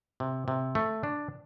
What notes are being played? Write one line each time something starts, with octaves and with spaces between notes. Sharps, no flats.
C3
C3
A3
D4